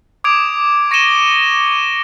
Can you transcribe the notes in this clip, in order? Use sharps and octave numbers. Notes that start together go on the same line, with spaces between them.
D6 D#6 G#6 D7 F7
C#6 A#6 C#7 D#7 E7 G7